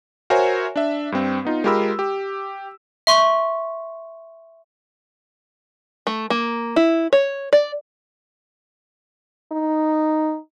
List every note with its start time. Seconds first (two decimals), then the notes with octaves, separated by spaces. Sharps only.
0.30 F#4 A#4 C5 C#5 E5 G#5
0.76 D4 E5
1.12 G2 C4
1.45 B3 D#4 F4
1.64 G#3 F4 G4 A#4 B5 E6
1.99 G4
3.07 E5 C6 C#6
6.07 A3
6.30 A#3
6.76 E4
7.13 C#5
7.53 D5
9.52 D#4